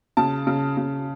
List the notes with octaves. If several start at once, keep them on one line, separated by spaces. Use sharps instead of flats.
C#3 A5
C#3
C#3